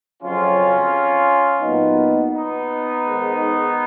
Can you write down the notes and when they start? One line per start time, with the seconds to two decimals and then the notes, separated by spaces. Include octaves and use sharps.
0.22 F2 C#3 F#3 C#4 F4
1.62 A#2 F#3 B3 D#4
2.32 B3 D#4
3.02 G#2 D#3 G#3